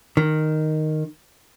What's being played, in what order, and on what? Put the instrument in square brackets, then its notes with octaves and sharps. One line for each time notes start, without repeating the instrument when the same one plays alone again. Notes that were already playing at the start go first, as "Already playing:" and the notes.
[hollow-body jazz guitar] D#3